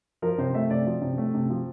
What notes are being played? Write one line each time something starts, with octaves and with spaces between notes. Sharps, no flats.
F3 A#4
C3 C5
A3 E5
C3 D5
F3
C3
A3
C3
F3